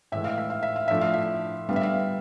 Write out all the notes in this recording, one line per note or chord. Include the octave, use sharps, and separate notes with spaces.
A2 E3 G#3 E5
F5
E5
F5
E5
F5
A2 F3 A3 D4 E5
F5
E5
D3 G3 B3 F5
E5
F5